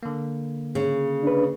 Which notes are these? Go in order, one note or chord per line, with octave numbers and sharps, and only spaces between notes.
D3 A#3
C#3
D4 B4